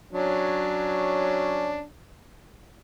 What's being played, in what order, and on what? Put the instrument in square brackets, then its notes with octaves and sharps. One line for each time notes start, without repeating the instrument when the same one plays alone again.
[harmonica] F#3 C#4 D4